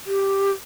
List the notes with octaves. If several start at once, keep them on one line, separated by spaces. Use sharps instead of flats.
G4